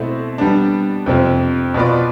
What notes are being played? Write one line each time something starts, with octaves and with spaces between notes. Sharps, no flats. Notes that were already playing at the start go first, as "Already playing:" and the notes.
Already playing: B2 A3 C4 E4
G3 B3 D4
F2 C3 F3
B2 B3 F4 B4 D5